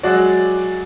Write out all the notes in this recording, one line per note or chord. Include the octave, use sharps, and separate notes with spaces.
F#3 G#3 F#4 D5